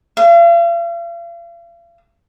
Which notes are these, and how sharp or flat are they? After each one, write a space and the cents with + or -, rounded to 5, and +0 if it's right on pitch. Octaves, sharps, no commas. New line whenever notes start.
F5 -40